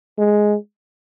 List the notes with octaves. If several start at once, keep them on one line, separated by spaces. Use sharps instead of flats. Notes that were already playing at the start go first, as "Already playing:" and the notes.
G#3